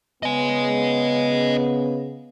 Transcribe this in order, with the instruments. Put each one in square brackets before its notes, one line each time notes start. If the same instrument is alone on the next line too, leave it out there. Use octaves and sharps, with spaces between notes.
[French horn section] C#3 B3 [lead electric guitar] D#5 G#5